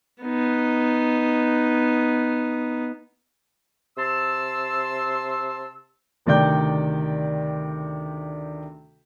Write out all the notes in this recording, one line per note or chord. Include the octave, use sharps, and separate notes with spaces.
B3 D#4
C3 A5 C6 E6
D2 C3 D#3 D5 G5 G6